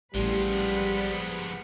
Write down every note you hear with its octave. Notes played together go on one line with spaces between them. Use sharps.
A1 F3 G3 G#3 B4 F#5